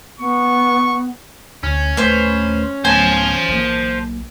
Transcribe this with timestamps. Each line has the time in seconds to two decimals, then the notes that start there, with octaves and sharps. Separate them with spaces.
0.20 B3 C#6
1.63 D2 C#4
1.97 D#1 A3 B4 C5
2.85 D1 A3 B3 C5 G#5 A5
3.48 B1 A#3